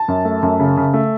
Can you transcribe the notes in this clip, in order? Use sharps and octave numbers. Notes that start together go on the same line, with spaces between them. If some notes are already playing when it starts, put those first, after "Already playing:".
Already playing: A5
F#2
A3
F#2
C#3
C#3
A3